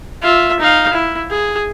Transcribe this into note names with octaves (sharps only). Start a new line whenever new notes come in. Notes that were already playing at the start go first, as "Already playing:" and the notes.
F4 E5
D#4 F5
E4
G#4